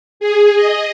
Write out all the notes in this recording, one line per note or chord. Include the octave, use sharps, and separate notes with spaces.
G#4
D#5